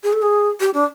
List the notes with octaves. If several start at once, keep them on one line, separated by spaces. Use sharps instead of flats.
G#4
A4
G#4
G4
D4